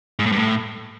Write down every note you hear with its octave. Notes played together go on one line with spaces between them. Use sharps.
G#2
A2
G2
A2